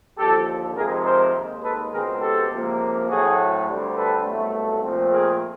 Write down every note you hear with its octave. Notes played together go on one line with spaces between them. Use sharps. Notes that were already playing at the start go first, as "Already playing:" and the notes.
D#2 D3 F3 G4 A4
F2 C3 D#3 G#3 C4 G#4 A#4
A#4 C5
D#2 D#3 G#3
A4 B4
C#2 B2 G#3 C4 G#4 A#4
G4 A4
C#2 C3 F3 A#3
A2 F#3 A3 C4 F#4 G#4
D2 D3 G3 C4
A4 B4
C2 B2 F#3 A3
A#2 F3 A3 C4
G#4 A#4